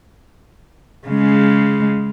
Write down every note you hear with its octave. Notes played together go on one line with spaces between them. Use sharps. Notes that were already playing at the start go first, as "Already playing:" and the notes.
C#3 G#3